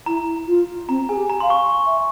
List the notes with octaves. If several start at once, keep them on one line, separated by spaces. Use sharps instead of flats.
E4 A#5
F4
C4 A#5
G#4 G#5
G4
A#5
F5 C6
C#6
C#6
E5